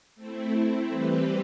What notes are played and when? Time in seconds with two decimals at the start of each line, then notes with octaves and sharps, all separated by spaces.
0.15 A3 C4 E4
0.89 E3 G3 C4 G4 B4